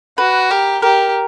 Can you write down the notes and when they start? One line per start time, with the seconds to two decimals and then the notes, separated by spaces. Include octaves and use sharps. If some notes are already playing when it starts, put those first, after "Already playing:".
0.18 F#4 B4
0.51 G4 A#4
0.82 G4 A#4